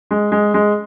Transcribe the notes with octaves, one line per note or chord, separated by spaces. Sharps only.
G#3
G#3
G#3